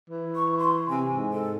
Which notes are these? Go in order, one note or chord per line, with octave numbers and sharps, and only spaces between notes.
E3
C#6
C6
C3 G#5
G#2
A4